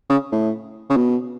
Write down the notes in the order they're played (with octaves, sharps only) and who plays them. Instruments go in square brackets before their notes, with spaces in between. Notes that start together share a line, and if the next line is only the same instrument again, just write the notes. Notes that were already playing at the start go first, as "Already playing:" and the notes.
[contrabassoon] C#3
A2
C#3
B2